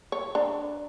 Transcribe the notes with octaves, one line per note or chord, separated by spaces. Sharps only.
C#5
D4 A#5